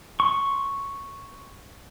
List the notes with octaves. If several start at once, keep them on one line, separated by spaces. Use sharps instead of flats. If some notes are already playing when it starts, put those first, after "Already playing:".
C6 C#6